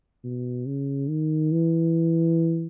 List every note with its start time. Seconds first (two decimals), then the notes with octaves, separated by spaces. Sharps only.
0.24 B2
0.66 C#3
1.09 D#3
1.52 E3